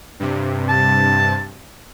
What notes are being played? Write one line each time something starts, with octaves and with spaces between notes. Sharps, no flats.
G2 C3
A5